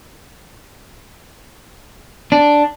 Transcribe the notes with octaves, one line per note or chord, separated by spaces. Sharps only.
D4